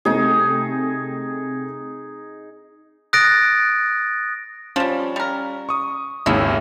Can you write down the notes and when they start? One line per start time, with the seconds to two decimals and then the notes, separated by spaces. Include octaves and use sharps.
0.05 C3 A3 C4 D#4 G#4
3.13 D#6 F#6 A6 A#6 D7
4.76 F3 G3 C#4 E7
5.16 G3 A#4
5.69 C#6 D#6
6.26 G#1 D#2 C#3 A#3 C#4 E4